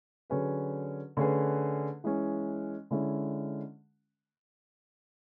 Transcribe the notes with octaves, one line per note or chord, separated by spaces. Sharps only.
D3 F#3 C#4 G#4 B4
D3 A3 C#4 G#4 B4
E3 G#3 C#4
D3 G#3 C#4 E4